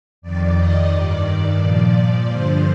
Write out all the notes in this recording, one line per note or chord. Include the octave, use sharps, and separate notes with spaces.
F2 D#3 D5
D#5
G2 D#3 D5
A#2 F3
G2 D3 F3 C5